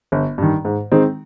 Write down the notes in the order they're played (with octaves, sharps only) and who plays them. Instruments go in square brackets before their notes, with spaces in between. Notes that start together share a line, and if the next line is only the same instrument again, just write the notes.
[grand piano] G1
G2 D#3
G#2
D#3 G#3 C4 D#4